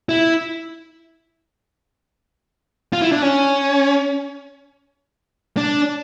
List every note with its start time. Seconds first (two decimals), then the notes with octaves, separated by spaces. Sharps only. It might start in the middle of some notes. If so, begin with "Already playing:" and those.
0.09 E4
2.93 F4
3.02 E4
3.12 D4
3.22 C#4
5.57 D4